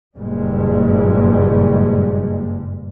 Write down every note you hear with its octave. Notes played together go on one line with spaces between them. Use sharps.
F#1 G2 A#2 G3 G#3